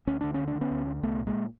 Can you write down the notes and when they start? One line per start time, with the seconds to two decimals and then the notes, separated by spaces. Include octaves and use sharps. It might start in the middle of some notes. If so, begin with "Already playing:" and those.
0.07 D2 C#4
0.21 D3 D4
0.34 D2 C#4
0.48 D4
0.55 D3
0.61 B3 C#4
0.71 D2
0.87 D3
1.03 C2 A3 B3
1.19 A#2
1.27 G#3 A#3